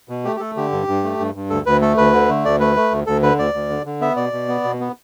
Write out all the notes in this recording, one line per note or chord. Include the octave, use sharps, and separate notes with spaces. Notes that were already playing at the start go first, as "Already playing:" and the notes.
B2
A3 G4
G4
A3 A4
D3 G4
G2
G2
A3
G2
G2
D2 A4
D2 B4
A3 A4
D2 B4
D3
A3
D2 D5
A3 B4
A3
D2
D2 A4
D3 B4
D2 D5
D2
D3
D3
B3 E5
B2 D5
B2
B3
B2
B3